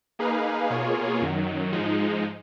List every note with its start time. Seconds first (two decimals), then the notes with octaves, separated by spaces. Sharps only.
0.19 A#3 D#4 G#4 B4 F5
0.70 B2 A#3 F4 G#4 C#5
1.21 F#2 D#3 F#3
1.72 G#2 F3 G#3 D#4